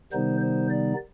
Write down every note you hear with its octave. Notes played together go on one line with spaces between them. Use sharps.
C3 D#3 G3 B3 D#4 C5
C5
D5